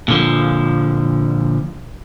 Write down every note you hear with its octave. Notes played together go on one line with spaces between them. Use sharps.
A#2 D3 F3